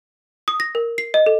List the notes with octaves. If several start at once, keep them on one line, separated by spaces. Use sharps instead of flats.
D#6
A#6
A#4
C7
D#5
A4